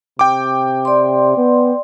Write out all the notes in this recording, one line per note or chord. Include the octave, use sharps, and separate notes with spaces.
C3 G5 D6
D5 C6
B3